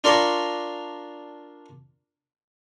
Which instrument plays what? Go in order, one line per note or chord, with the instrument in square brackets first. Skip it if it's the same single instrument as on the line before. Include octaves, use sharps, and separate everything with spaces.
[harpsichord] D4 F4 A#4 D5 C6 C#6